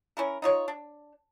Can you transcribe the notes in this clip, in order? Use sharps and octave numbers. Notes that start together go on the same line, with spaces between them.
C#4 E4 A#4
D#4 F4 C#5
D4